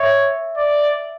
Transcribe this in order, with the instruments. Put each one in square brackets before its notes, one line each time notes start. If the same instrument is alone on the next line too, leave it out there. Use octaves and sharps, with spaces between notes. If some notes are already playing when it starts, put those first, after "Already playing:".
Already playing: [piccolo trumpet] C#5 [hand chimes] E5
[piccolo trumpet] D5